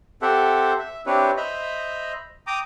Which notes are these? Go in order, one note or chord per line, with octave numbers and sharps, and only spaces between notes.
C4 G4 A4 C5 E5 F#5
E5
C4 D4 E4 G4 B4 C#5
C5 D#5 E5 A#5 B5
G5 A#5 D6 D#6